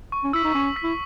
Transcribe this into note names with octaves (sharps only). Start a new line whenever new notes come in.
C#6
C#4
E4 E6 B6
D#4
C#4 C#6
E6 B6
E4